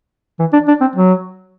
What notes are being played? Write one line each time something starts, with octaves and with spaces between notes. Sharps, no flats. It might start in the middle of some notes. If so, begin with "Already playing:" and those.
E3
D4
D4
C4
F#3